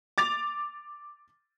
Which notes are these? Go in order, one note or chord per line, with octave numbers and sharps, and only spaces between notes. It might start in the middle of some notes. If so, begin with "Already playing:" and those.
D6 A6 F7